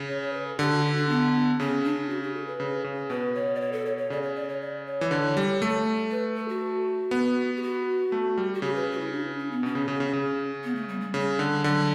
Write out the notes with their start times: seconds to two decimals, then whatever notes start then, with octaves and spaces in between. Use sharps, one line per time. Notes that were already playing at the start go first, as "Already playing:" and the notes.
Already playing: C#3
0.08 C#5
0.22 C#5
0.33 B4
0.47 A4
0.58 D3 G4
0.72 F#4
0.84 D4
0.96 D4
1.09 B3
1.59 C#3 C#4
1.85 D4
2.10 F#4
2.23 G4
2.34 A4
2.47 B4
2.60 C#3
2.84 C#3
3.10 B2 B4
3.35 C#5
3.55 D5
3.61 C#5
3.72 A4
3.86 C#5
3.98 C#5
4.10 C#3 D5
4.22 C#5
4.35 D5
4.49 C#5
4.61 D5
4.86 C#5
5.01 E3
5.11 D3
5.37 G3
5.62 A3
6.11 B4
6.36 A4
6.48 F#4
7.11 B3
7.57 G4
7.62 F#4
8.12 A3
8.38 G3
8.54 F#4
8.62 C#3 G4
8.75 B4
8.92 F#4
9.00 E4
9.12 D4
9.38 C#4
9.51 B3
9.63 B2 C#4
9.75 C#3
9.88 C#3
10.00 C#3
10.13 C#3
10.64 B3
10.75 A3
10.88 G3
11.01 G3
11.13 C#3 G3
11.39 D3
11.56 G3
11.64 D3 F#3